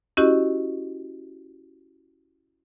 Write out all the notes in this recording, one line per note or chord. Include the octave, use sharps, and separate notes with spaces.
C#4 E4 F#4 G4 D#5